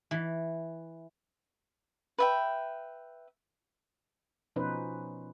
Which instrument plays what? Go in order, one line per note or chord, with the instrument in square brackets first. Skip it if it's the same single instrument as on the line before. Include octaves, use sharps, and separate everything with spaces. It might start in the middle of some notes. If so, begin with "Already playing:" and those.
[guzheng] E3
[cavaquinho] B4 E5 G5
[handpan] B2 F3 C#4 D#4 B4 C5